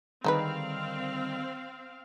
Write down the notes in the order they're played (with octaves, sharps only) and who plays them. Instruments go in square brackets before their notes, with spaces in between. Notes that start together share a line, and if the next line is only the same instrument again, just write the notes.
[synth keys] D3 D#3 G3 [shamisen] G#3 D#4 B4 [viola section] C4 F5